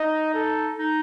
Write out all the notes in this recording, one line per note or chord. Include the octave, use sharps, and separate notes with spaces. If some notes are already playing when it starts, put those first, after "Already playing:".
Already playing: D#4 D#5
A4
D#4